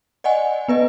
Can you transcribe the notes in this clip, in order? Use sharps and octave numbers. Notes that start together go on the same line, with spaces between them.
D5 D#5 F#5 G#5
B3 B4 D#5